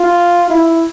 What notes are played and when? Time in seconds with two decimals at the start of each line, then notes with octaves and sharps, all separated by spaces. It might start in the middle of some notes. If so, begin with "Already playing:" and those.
Already playing: F4
0.50 E4